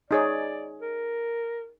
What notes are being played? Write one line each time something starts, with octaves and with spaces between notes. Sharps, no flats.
D#4 G#4 C#5 D5
A#4